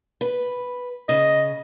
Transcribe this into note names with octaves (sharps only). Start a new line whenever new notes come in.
B4
C#3 D#5